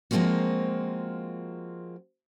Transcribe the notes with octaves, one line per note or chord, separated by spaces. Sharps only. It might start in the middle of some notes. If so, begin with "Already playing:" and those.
F3 G#3 A#3 C4 F4 F#4